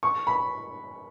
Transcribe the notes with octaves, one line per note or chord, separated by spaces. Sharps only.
C#6
B5